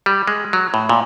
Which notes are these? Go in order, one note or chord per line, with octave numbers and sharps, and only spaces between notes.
G3
G#3
F#3
A2
A#2